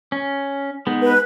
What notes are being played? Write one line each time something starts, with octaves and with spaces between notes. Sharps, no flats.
C#4
G#3 B3 D#4
B4